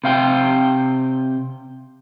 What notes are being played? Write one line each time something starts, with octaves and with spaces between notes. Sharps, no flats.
C3 F5 G5